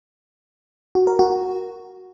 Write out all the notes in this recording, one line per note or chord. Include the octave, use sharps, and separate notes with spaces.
F#4
A#4
F#4